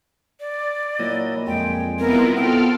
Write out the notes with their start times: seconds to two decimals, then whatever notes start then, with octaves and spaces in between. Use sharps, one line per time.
0.40 D5
1.00 A#2 F#3 E4 D#5
1.47 F2 G#3 G5
1.99 C2 B3 E4 F4 A#4
2.37 B2 B3 C4 F4 A4 F5 G5